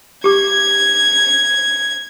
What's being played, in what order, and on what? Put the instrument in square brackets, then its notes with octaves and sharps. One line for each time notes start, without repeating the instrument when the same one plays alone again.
[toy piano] G4 D6 [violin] G#6